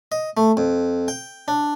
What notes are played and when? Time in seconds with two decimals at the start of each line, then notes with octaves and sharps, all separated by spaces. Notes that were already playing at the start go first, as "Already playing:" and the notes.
0.12 D#5
0.37 A3
0.57 F2
1.08 G5
1.48 D4